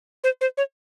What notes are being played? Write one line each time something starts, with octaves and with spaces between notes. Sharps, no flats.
C5
C5
C#5